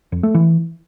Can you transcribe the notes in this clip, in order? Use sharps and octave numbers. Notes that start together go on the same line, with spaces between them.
F2
A3
E3